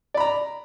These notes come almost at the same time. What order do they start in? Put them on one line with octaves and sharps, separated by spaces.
D5 B5 A#5